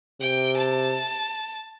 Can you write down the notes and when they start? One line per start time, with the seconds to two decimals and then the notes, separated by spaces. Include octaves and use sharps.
0.20 C3 G5
0.57 A5